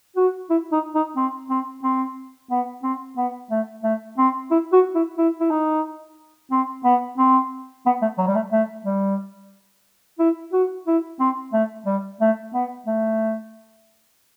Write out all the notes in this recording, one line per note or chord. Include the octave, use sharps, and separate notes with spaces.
F#4
E4
D#4
D#4
C4
C4
C4
B3
C4
B3
A3
A3
C4
E4
F#4
E4
E4
E4
D#4
C4
B3
C4
B3
A3
F#3
G3
A3
A3
G3
E4
F#4
E4
C4
A3
G3
A3
B3
A3